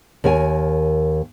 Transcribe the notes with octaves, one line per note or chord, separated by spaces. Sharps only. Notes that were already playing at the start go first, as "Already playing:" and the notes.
D#2 A#4 C#5 G#5